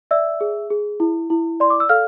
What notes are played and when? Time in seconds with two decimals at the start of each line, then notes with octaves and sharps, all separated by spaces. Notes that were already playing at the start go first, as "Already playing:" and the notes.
0.11 D5 E5 E6
0.41 G#4
0.70 G#4
1.00 E4
1.30 E4
1.60 D5 C6
1.70 D6
1.80 E6
1.89 A4 F5 F6